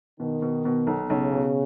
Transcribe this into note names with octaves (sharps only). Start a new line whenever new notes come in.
B2 D#3
B2
B2
B1
B1 C#3
B2